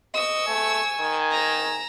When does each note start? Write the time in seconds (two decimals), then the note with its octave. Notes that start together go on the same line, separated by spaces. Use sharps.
0.14 D#5 C#6 E6
0.48 A3 G#5
1.00 D#3
1.32 A#5 E6